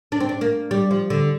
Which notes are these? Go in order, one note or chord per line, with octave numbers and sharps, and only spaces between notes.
D4
C4
D4
A#3
G3
F3
D3